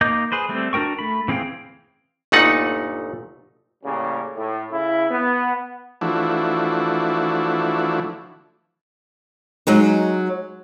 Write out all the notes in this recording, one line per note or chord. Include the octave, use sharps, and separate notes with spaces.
A#3 D#4 D#5 D6 G6
G#4 B4 C5
G3 A3 C4
D4 F#4 A#4 G5 C#6
A3 B5
E3 C4 G#4 F5 G5
G1 A#2 A3 D#4 F#5
A2 C#3 G3 A#3 C#4
A2
C#3 E4
B3
E3 F3 A3 D4 E4 F#4
F#3 G#3 D#4